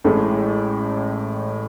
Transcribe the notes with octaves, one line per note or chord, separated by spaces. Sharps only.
A1 A2 G#3 A4